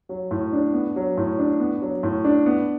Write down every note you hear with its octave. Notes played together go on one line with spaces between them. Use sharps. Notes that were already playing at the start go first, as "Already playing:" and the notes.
F#3
A2
D4
B3
F#3
A2
D4
B3
F#3
A2
D4
B3